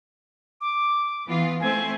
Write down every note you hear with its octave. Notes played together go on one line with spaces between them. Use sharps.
D6
E3 B3 F4
A3 C4 C5 G#5